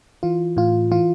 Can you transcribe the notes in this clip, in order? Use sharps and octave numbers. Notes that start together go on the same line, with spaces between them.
E3 F4
A2 F4
E3 F4